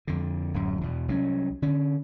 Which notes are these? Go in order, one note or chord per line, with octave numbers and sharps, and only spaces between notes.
F2 D3
D1 F#2
E2 B2
C2 F#3 A#3 C#4
D3 C#4